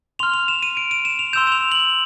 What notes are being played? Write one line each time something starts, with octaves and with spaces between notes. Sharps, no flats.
C6 F6 F7
F7
E7
D#7
D7
D#7
E7
F7
C6 E6 G6 E7
E7
F7
F#7